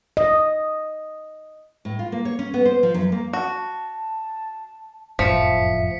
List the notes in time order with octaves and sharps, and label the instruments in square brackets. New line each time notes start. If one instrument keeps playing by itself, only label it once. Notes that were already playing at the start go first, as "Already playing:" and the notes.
[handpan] D#5
[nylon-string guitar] A2
F4
A#3
C#5
C#4
B3
C5
F3
F#2
A#3
[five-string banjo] F#4 [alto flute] A5
[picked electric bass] F#1 F2 A2 [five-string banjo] F3 [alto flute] E5 [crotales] B6 C#7